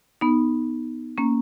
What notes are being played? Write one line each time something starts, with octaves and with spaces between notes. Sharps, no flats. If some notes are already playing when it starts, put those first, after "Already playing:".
B3 D#4
A#3 C#4